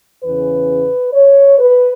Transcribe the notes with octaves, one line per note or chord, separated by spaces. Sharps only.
E2 C#3 E3 C#4 B4
C#5
B4